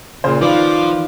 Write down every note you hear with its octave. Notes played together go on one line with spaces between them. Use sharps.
A#2 C#3 C5
D#3 F3 F4 B4 D5 D6